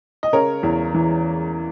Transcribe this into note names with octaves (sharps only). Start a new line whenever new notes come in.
D#5
C#3 A#4 C#5
E2
E3